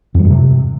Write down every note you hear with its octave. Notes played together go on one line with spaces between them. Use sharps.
F2
F#3
G2
C3